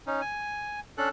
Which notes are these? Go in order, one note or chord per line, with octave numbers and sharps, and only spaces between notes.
C#4 D#4
G#5
C#4 D4 A4 F#6